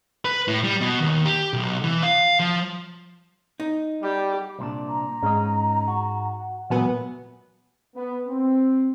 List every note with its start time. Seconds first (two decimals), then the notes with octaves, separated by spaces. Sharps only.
0.25 B4
0.48 A2
0.64 G3
0.81 B2
1.00 D#2
1.26 G4
1.53 B1
1.84 E3
2.03 F5
2.40 F3
3.60 D#4
4.03 G3 G4
4.59 C2 A#2 D4
4.88 A#5
5.23 G#2 C#4 D#5
5.88 F#4
6.70 C#2 A#2 E3 F#3 B3 G#5
7.96 B3
8.27 C4